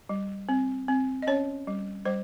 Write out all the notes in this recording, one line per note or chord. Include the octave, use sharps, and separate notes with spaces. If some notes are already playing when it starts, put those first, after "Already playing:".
G3
C4
C4
D#5
C#4 C#5
G3
G3 C5